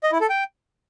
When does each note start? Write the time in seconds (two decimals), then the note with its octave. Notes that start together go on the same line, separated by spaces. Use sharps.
0.03 D#5
0.12 E4
0.21 A4
0.30 G5